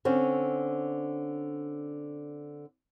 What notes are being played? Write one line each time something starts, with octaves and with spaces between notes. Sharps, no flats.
D3 C4 C#4